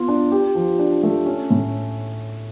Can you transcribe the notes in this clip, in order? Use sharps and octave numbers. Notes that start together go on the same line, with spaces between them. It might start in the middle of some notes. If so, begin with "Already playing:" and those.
Already playing: B3 F4
D4
G4
F3
D4
A3
C#4
A2